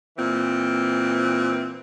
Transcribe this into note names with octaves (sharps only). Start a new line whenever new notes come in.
A#2 E3 C4